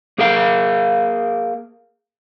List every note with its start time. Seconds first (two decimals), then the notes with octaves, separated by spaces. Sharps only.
0.18 A#3 G#4 A#4 F5